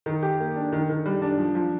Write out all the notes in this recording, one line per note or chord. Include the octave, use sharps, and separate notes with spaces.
D#3
G4
A#3
D4
D#3
D#3
G3
D4
F3
F3